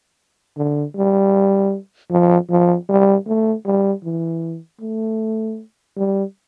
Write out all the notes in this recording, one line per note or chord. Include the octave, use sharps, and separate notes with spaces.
D3
G3
F3
F3
G3
A3
G3
E3
A3
G3